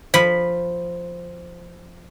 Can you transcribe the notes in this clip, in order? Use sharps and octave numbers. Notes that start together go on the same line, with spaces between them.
F3 B5